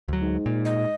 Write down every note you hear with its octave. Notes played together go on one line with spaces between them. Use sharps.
D2 F#3
G#2
A#2
D#5